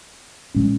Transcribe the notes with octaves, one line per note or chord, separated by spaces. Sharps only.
A#2 G#3 C#4